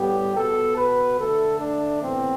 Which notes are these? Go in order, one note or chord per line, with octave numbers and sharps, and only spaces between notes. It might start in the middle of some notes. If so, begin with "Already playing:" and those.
Already playing: A2 G3 B3 G4
B2 B3 A4
B4
D3 A3 A4
D4
A2 E3 B3 C4